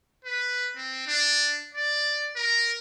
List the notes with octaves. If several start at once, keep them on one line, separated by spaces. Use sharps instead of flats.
B4
C4
D4
D5
A#4